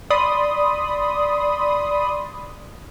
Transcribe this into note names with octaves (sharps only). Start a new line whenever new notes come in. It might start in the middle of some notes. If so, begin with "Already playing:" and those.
D5 B5 C6 D#6